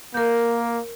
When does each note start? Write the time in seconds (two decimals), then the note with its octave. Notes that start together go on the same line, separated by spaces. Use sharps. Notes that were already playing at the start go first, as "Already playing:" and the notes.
0.14 A#3 A#4 G6